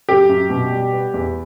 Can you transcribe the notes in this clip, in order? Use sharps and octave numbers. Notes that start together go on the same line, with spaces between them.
F#2 G4
F#2
B2
G3
B3
E2